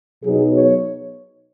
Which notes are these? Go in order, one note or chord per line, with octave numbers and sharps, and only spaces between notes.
B2 F#3 B3 D#4 G#4
C#5